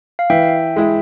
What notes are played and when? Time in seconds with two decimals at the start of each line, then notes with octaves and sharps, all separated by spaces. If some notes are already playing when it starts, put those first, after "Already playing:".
0.19 F5
0.30 E3 E5 G5
0.76 G#3 E4